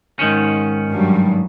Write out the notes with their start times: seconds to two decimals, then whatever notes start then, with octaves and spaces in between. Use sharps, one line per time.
0.19 G#2 D#3 C#4
0.90 G2 F#3 G3